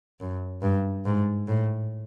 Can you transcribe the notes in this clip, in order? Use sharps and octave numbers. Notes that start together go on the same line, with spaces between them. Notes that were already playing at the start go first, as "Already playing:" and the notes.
F#2
G2
G#2
A2